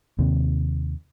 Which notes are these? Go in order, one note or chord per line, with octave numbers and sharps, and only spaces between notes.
D#2 C3